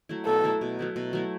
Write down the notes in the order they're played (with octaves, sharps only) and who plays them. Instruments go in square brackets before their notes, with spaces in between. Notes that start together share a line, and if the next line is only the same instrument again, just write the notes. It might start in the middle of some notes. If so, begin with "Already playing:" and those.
[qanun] F#3 A3 E4
[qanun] B2 [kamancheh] A4
[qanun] F#3 A3 E4
B2
F#3 A3 E4
B2
F#3 A3 E4